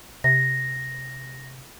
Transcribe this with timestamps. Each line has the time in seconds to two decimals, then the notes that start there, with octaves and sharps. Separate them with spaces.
0.24 C3 A#6